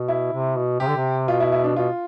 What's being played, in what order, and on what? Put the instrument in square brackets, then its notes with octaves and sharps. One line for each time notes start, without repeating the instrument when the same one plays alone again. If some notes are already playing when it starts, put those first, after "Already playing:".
Already playing: [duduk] B2
[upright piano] E4
[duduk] C3
B2
[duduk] C3 [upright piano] G4
[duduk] D3
C3
[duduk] B2 [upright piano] F4
[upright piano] E4
E4
D4
[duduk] B2 [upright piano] F4